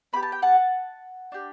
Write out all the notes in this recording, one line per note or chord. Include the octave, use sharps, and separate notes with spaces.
B3 E4 G4 B5
A5
G5
F#5 A5
D4 G4